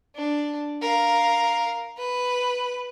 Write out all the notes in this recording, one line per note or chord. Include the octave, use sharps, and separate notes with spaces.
D4
A#4 F5
B4